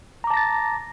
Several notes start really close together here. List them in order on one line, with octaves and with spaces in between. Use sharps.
A#5 D6 A5 A#6 A6